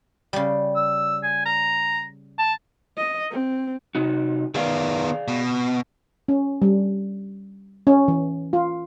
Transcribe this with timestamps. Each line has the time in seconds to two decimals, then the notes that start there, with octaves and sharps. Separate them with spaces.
0.33 C#3 G3
0.75 E6
1.23 G#5
1.45 A#5
2.38 A5
2.97 D#5
3.31 C4
3.95 C3 D#4 F#4
4.55 D#3 B3 G#4 D5 F5
5.28 B2
6.28 C#4
6.62 G3
7.87 C#4
8.08 E3
8.53 F4